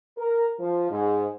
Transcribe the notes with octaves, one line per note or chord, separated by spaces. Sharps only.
A#4
F3
G#2